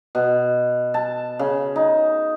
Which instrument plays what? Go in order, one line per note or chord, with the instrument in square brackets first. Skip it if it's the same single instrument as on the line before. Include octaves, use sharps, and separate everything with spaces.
[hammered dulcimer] B2
A5
C#3
D#4